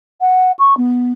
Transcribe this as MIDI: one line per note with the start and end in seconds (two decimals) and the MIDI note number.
0.21 0.52 78
0.59 0.76 85
0.77 1.12 59